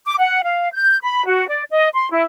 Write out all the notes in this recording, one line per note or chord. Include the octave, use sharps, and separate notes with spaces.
D6
F#5
F5
G6
B5
F#4
D5
D#5
C6
E4